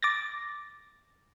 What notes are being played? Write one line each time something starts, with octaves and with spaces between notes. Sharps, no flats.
D6 A6 A#6